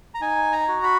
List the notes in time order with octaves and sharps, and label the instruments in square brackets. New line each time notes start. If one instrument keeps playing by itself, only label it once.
[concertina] A#5
D#4 G#5
A#5
F#4
B5